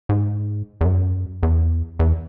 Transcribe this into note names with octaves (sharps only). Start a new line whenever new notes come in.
G#2
E2
F#2
E2
E2